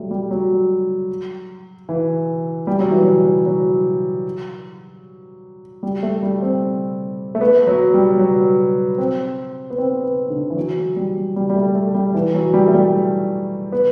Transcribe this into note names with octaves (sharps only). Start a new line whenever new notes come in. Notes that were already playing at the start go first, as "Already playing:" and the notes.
Already playing: F#3 G3 A3
G3
F#3
E3
G3
F#3
E3
F#3
F#3
G3
A3
G3
C4
A3
B3
F#3
G3
F#3
C4
B3
C4
B3
D3
E3
F#3
G3
G3
G3
A3
A3
G3
E3
F#3
G3
A3
G3
B3